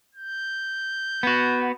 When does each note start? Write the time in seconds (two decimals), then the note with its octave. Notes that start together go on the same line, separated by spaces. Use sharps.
0.15 G6
1.23 B3 F#4